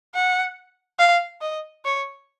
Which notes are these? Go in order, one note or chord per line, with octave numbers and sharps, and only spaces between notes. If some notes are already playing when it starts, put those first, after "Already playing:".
F#5
F5
D#5
C#5